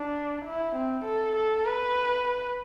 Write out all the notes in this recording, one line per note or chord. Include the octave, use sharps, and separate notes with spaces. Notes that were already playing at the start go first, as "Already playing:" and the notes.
Already playing: D4
E4
C4
A4
A4
B4